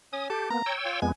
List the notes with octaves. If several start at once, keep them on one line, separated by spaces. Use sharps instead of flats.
C#4 D#6
G4 A4
A#3 B3 A#5
C#5 G5 E6
F4
F2 G#3 B3 G#5